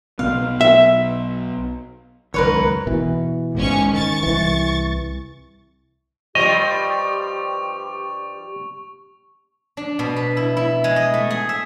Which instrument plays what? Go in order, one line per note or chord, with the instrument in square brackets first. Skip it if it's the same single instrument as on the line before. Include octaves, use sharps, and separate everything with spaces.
[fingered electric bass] B1 B2 B3 [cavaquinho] F5
[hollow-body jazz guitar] E5
[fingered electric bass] C#2 F#2 D#3 [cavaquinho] A#4 B4 C#5
[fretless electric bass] B2 E3
[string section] G#1 C#4 C#6
[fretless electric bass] D#3 [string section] C#6 A6
[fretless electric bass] C2 E3
[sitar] G2 F3 G3 [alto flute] G4 [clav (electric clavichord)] D#5 [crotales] C#6 F7
[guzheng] D4
B2
B4
E4
E4
G#3
D#5
A3
G#4
E5